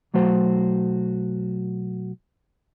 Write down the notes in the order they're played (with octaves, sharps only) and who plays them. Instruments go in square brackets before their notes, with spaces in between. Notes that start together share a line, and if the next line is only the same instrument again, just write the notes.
[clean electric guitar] B1 F#3 A3 F#4 C5